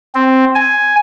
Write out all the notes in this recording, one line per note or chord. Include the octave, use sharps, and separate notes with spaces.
C4
G#5